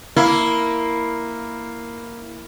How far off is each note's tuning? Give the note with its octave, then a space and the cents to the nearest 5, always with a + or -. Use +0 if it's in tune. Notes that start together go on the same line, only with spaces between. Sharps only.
A#3 +0 E4 +0